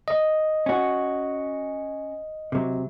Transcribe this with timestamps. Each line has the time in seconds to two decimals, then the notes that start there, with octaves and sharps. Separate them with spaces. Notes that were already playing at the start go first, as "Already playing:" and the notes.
0.08 D#5
0.66 C#4 F#4
2.52 C3 F#3